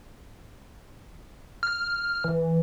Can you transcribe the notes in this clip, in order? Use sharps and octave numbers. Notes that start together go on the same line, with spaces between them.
F6
E3